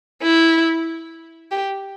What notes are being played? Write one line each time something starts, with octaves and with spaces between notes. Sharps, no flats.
E4
G4